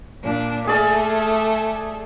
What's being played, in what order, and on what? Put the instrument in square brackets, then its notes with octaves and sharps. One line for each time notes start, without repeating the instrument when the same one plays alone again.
[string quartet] A#2 D4
[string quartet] A3 [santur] G#4 D5 F5